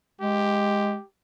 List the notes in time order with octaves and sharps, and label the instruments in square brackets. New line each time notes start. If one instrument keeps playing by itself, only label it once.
[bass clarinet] G#3 [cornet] G4